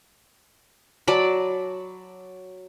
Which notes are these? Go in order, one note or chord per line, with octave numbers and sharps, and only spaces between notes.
F#3 D5 A5 B5